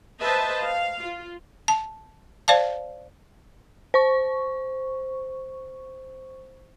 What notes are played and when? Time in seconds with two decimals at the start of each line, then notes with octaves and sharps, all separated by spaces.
0.20 B4 C5 D#5 E5 A5
0.65 F5
1.01 F4
1.68 A5
2.48 C5 D5 F5 A5
3.94 C5 C#6